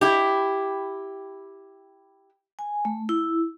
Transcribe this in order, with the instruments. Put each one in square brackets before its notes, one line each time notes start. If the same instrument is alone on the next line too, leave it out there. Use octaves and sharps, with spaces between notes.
[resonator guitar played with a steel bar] E4 G4
[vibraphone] G#5
A3
E4